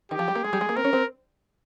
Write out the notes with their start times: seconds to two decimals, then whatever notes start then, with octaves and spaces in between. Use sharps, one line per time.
0.11 D#3 G4
0.19 F3
0.28 G3
0.35 A#3
0.44 G#3 G#4
0.53 G3
0.61 G#3
0.69 A#3
0.76 C4 A#4
0.84 C#4
0.93 C4